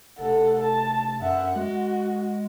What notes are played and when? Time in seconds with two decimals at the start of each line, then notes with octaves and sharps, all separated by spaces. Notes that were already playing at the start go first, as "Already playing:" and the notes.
0.19 F1 A4 F#5
0.63 A5
1.21 F#2 E5 F#5
1.56 G#3 F#4